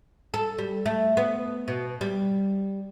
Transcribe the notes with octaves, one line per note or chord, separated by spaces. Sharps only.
A4
G3
A3
B3
B2
G3